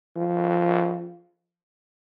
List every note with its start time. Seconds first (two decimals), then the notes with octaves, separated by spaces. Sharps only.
0.16 F3